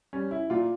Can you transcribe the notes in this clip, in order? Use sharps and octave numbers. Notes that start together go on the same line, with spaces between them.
G3 C#4
E4
A#2 F4